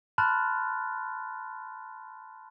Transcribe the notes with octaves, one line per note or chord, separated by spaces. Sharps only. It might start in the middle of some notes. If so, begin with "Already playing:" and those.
A5 B5 C6 F6 F#6 A6